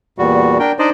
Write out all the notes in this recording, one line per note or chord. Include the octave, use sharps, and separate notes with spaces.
E2 A#2 G3 F#4
D4 A#4 G5
D4 D#4 C5 D5 D#5